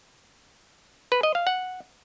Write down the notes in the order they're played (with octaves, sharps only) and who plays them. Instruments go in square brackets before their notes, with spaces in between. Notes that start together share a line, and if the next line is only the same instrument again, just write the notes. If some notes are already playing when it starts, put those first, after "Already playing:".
[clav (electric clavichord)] B4
D#5
F5
F#5